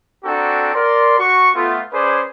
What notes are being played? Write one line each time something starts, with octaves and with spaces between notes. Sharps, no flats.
C4 D4 F#4 A4 G5 A#5
A#4 D5 C6
F#4 C#6
A3 B3 F4
C#4 G#4 B4 C5 D5